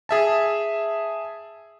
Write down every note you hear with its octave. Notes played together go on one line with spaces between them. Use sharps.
G#4 E5 A5